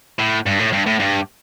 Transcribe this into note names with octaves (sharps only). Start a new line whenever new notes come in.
A2
G2
A2
G2
A2
G2